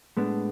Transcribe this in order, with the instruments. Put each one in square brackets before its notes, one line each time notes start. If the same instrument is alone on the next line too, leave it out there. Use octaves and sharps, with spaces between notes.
[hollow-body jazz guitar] A2 G#3 B3 D4